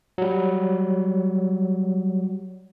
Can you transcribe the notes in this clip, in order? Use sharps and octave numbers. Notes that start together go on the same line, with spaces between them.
F#3 G3